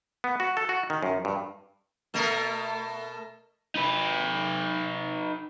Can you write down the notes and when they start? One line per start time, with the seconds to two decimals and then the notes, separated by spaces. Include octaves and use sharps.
0.24 B3
0.40 F#4
0.57 A4
0.69 F#4
0.90 D#3
1.03 F#2
1.25 G2
2.14 B2 A3 A#4
3.76 D#4 B4